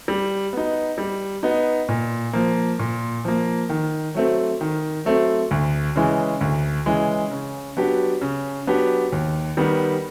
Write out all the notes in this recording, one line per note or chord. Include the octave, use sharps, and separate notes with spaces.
G3
B3 D#4
G3
B3 D#4
A#2
F3 A#3
A#2
F3 A#3
D#3
F#3 A3 C4
D#3
F#3 A3 C4
D2
C#3 E3 G#3
D2
C#3 E3 G#3
C#3
F#3 B3 D4 G4
C#3
F#3 B3 D4 G4
D#2
D#3 G3 B3